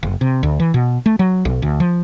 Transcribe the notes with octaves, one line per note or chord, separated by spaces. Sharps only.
F#1
C3
D2
E3
B2
A3
F#3
B1
D2
F3